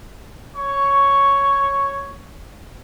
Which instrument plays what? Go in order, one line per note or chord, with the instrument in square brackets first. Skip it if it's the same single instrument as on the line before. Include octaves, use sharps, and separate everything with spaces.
[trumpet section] C#5 C#6